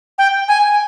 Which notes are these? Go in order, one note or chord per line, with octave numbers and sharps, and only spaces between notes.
G5
G#5